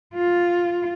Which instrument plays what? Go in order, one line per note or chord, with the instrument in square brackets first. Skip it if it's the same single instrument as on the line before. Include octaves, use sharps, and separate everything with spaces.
[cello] F4